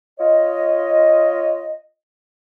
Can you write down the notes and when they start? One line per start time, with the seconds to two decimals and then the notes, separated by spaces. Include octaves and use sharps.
0.19 F4 C#5 D#5